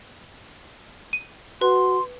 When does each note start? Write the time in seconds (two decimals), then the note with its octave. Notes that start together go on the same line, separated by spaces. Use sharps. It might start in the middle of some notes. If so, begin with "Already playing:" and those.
1.13 D#7
1.61 F#4 B4 C6